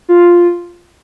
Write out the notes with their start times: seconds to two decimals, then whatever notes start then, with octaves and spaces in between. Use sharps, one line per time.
0.09 F4